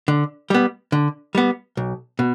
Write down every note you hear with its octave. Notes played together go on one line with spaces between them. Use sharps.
D3
G3 B3
D3
G3 B3
B1
B2